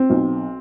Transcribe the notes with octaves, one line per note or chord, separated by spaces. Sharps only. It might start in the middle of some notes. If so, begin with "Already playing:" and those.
Already playing: C4
B1